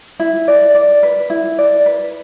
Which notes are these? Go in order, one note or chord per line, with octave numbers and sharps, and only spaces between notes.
E4
D5
D5
B4
E4
D5
B4